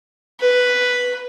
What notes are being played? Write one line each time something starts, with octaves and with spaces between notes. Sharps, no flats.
B4